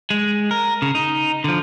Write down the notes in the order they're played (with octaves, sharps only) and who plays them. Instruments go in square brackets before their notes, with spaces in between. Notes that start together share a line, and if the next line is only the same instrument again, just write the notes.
[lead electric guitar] G#3
A#4
C#3
D#4
D3 F3